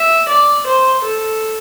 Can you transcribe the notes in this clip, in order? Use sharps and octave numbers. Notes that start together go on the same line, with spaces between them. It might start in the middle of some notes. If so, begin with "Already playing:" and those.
Already playing: E5
D5
C5
A4